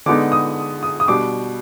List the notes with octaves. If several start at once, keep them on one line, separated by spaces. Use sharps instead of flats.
D3 G#3 B3 D#4 D6
D#6
D#6
D#6
B2 G3 D4 D6